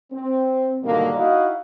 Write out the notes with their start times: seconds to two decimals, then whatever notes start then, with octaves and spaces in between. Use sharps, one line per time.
0.12 C4
0.83 G#2 B2 D3 D#3 G3 A#3
1.16 D#4 E4 F#4 D#5 F5